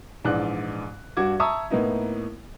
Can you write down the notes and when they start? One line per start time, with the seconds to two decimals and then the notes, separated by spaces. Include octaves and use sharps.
0.24 A#1 G#2 E3 G#3 D5 F#6
1.17 G2 D4 F#4 D6 G#6
1.40 E5 A5 A#5 C#6 D#6 E6
1.71 A2 A#3 B3 D#4 E4